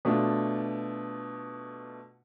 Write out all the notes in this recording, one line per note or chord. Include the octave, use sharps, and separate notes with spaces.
B2 A3 D4 F4